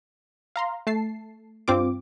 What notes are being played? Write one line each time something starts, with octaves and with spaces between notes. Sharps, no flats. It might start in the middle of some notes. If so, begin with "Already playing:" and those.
F5 A#5 C6
A3 A5 C7
G2 C4 F4 D6